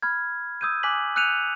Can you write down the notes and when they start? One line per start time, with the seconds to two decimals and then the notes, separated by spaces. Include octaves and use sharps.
0.02 B5 F6 G#6
0.61 D#6 E6 G6 G#6 D#7
0.83 G#5 D6 F#6 B6 F#7
1.16 E6 F#6 G6 C#7 D#7 F7